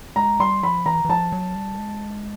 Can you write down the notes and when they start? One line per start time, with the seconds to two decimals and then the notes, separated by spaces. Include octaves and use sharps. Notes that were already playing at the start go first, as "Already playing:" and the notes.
0.16 G#3 A#5
0.40 G3 C6
0.63 F3 B5
0.86 E3 A#5
1.05 E3
1.09 F3 A5
1.32 F#3
1.55 G3
1.78 G#3